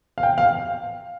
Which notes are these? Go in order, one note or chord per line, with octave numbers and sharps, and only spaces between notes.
F5
G5
F5